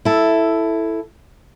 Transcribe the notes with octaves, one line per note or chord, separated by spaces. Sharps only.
E4 A4